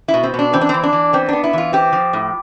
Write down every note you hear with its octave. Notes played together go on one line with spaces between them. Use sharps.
E4
B2
C4
B2 D4
E3 C4
D4
E3 C4
D4
E3
B3 C4
B3 D4
E4
E3 F4
C4 G4
F3
A2